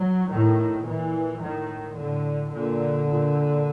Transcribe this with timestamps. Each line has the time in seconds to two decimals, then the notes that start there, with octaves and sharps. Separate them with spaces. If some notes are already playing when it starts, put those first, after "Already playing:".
Already playing: F#3
0.29 A2 D#3
0.85 A#2 E3
1.40 A2 D#3
1.96 A2 D3
2.52 A#2 D3
3.07 A#2